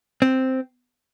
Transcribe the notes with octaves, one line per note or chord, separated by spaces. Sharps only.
C4